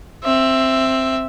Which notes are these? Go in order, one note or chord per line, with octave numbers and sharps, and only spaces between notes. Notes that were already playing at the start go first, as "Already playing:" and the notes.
C4 E5